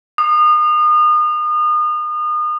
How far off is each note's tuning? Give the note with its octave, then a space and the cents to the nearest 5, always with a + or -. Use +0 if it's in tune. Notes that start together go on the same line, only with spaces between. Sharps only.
D#6 -35